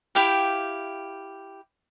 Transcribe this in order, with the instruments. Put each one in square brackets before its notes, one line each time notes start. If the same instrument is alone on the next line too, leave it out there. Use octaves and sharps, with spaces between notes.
[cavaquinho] E4 G4 F5 G5